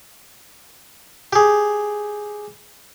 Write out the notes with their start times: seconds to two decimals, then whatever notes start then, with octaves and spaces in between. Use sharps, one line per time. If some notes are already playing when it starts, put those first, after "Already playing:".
1.33 G4 G#4